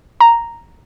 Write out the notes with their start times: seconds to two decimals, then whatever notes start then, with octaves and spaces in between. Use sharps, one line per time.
0.21 A#5